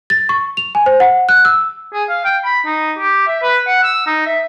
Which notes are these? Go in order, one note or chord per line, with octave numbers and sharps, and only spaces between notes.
A6
C#6
F7
G#5
C5
F#5
F#6
E6
G#4
F5
G5
B5
D#4
G4
E5
B4
F#5
E6
D#4
E5